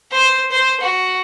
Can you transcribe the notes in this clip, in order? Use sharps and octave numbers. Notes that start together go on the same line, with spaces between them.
C5
C5
F#4